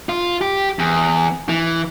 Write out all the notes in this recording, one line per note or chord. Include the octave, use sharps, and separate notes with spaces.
F4
G4
E2
E3